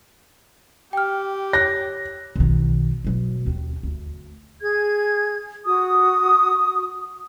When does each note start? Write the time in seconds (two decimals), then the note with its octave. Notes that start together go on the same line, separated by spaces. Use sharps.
0.93 G4 G5 F6
1.53 C#5 F#6 A#6
2.36 B1 D#3
3.04 B2 F#3
3.46 D#2 C#4
3.83 D2
4.62 G#4 G#6
5.65 F#4 D#6